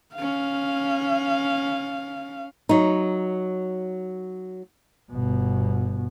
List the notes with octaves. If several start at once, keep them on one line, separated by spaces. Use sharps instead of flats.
C#4 F5
F#3 D#4
G1 B2